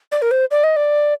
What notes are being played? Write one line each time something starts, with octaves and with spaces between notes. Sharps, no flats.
D5
A#4
C5
D5
D#5
D5